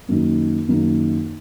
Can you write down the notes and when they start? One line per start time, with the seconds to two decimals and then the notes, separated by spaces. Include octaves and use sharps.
0.08 F#2 D#3 A#3 D#4
0.68 F#2 D#3 A#3 D#4